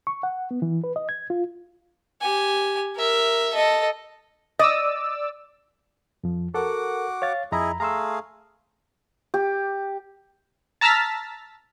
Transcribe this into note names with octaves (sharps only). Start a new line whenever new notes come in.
C#6
F#5
B3
E3
B4
D#5
G#6
F4
G4 G#5
A#4 E5
A4 D#5
D5 D#5 D6 E6
F2 F3
F#4 A4 A#4 F#5 D6
C#5 F5 A6
F2 E4 G#4 D#5 A#5 B5
A3 G#4 F5 A#5 C6 E6
G4
A5 A#5 E6 F6 A6 B6